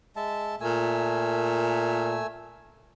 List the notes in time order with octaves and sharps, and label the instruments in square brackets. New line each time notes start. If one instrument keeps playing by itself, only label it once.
[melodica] G#3 E5 A5
[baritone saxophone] A#2 [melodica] A3 G#5 E6